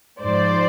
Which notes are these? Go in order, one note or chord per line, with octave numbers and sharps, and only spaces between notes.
G#2 F3 C5 D5